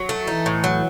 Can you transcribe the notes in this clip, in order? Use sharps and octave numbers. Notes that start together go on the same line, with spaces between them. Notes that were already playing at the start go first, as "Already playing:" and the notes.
Already playing: F#3
A3
E3 D#4
A2
F#3